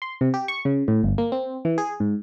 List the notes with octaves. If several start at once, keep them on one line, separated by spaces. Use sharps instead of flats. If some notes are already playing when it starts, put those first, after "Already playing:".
C6
C3
G4
C#6
C#3
A2
G1
A#3
C4
E3
G#4
G#2